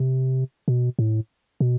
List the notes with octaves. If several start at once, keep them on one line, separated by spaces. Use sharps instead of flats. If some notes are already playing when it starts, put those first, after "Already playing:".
Already playing: C3
B2
A2
B2